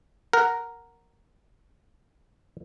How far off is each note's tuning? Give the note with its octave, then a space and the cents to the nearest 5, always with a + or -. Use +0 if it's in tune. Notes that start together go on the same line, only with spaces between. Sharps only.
A#4 +0 F#5 +0